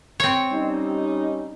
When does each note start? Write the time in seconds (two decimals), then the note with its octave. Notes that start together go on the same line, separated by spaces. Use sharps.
0.20 C4 C#5
0.52 G3 C#4 D#4